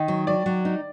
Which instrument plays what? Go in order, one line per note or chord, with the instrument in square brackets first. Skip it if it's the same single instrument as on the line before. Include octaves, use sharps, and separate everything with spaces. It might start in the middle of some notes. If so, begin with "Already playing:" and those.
Already playing: [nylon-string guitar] D#3 [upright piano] D#5
[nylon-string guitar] F#3
[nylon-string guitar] F#3 [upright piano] D5
[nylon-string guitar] F#3
D#4